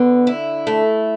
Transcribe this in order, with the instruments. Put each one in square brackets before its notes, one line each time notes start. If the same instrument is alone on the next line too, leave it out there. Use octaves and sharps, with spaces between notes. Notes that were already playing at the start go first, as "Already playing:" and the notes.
Already playing: [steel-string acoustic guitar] D3 [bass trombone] B3
[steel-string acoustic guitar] E4
A3